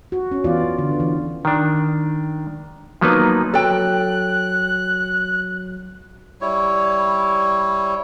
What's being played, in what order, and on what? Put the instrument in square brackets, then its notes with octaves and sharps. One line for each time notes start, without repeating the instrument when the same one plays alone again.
[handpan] F#4
C#4
E3 B3 F4 D5
D3
E3
[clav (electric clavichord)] D#3 D4
F3 F#3 A#3 B3 D#4 B4
[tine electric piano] F#3 [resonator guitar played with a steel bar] A4 G5 [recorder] F#6
[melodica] G3 E4 C#5